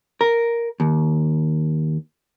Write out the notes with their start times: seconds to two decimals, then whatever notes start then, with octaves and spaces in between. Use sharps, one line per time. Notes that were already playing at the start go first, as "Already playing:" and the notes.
0.21 A#4
0.80 D#2